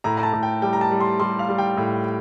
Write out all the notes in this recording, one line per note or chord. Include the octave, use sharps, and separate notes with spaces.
A2 A#5
A#5
A5
A2
G5
G3 G5
A#5
A5
G3
C6
G3 C6
F5
G3
G5
A2